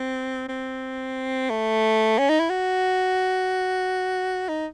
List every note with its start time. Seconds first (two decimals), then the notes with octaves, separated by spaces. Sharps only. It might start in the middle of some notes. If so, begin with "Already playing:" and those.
Already playing: C4
0.49 C4
1.50 A3
2.18 C#4
2.29 D#4
2.40 E4
2.50 F#4
4.49 D#4